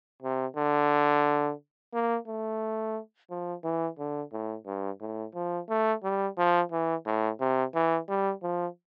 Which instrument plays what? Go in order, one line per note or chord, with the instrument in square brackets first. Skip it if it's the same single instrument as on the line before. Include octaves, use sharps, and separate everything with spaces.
[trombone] C3
D3
A#3
A3
F3
E3
D3
A2
G2
A2
F3
A3
G3
F3
E3
A2
C3
E3
G3
F3